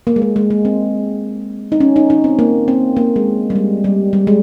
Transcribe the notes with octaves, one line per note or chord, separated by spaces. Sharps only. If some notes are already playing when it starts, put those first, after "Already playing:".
A#3
G#3
A#3
G#3
G#3
C4
D#4
C#4
D#4
D#4
C4
A#3
C4
A#3
G#3
G3
G#3
G3
G3
G#3